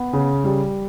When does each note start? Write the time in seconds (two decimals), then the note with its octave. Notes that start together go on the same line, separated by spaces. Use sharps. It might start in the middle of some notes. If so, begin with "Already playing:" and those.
Already playing: B3
0.13 C#3
0.44 G3